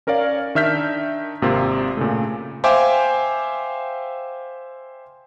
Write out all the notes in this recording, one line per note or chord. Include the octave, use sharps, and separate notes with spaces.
C#4 A#4 C#5 D5 F5
D#3 D4 E5 F6 G6 B6
G#1 C3 A#3 C4 F4
A#2 C#3 A3
C5 E5 F5 G5 G#5 D6